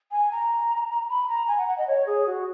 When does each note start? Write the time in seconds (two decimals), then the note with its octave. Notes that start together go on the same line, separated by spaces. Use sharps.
0.12 G#5
0.32 A#5
1.09 B5
1.29 A#5
1.48 G#5
1.58 F#5
1.68 F#5
1.78 D#5
1.88 C#5
2.07 G#4
2.27 F#4